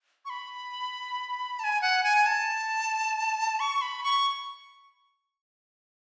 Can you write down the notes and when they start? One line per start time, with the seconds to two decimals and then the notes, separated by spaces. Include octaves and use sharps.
0.25 C#6
0.30 B5
1.59 A5
1.64 G#5
1.82 F#5
2.04 G#5
2.26 A5
3.60 C#6
3.81 B5
4.04 C#6